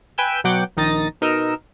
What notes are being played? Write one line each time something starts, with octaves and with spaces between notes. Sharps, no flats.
B4 G5 G#5 E6 G6
B2 F#3 F#5 G5 D6
A#1 D#3 D#4 D#6 A6 A#6
B2 D#4 A#4 D#5 E6 D#7